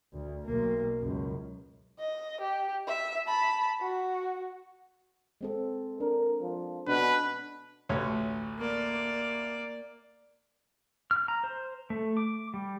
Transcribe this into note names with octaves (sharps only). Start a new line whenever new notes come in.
D2
B1 A#3
C#2 F#2
D#5
G4
E5
A5 B5
F#4
G#3 C4 A4
D4 A#4
F3
B2 D4 B4
A1 D2 C#5
A#3 D5
F6
A#5
C5
A3
D6
G3